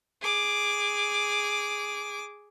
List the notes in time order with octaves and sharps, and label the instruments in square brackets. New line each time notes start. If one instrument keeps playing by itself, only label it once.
[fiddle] G#4 D6